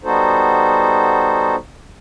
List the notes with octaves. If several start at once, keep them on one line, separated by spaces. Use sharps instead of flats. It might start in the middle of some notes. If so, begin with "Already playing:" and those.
G3 B3 D#4 F#4 A4 C5